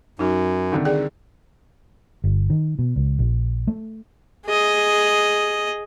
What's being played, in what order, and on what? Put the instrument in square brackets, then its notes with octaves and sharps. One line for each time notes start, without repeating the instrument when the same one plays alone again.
[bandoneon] F#2 [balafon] D#4 F#4
[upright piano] C2 D3 D#3
[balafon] G#4 D5 G5
[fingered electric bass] G1
D#3
B2
C#2
A#1
A3
[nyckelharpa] G#4 D#5